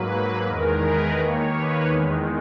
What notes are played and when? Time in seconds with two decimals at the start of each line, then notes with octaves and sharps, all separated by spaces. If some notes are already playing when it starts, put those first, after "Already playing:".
Already playing: G#2 F#3 A#3 B4
0.47 E2 D#3 G#3 A#4
0.83 B4
1.19 D#2 D#3 A#3 C#5
1.55 B4
1.91 E2 D#3 G#3